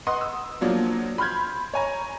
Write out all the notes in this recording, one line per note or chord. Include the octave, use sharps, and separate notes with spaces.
B4 D#5 F#5 C6 D#6
E6
F3 F#3 A#3 D4
B5 C6 F6 G6 G#6
C#5 G#5 A#5